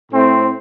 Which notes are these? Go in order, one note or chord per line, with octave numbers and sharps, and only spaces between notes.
A2 A3 C4